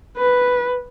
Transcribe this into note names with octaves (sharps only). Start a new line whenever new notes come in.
B4